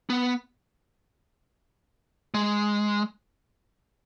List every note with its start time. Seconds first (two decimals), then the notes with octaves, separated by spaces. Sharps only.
0.10 B3
2.34 G#3